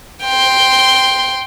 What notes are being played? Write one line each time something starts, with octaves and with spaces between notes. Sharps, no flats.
G5 C6